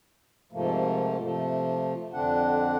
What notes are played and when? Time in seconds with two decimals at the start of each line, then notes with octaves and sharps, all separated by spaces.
0.52 G#2 C3 F3 A3 A#3
1.19 C3 F3 A3
2.13 F2 D3 C4 D4 F#5